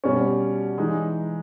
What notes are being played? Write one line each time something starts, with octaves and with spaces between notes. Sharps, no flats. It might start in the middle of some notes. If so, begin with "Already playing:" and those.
B2 G3 C#4
E3 G#3 D#4